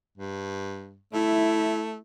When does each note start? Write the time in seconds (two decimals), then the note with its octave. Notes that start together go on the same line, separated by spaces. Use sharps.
0.18 G2
1.13 A3 E4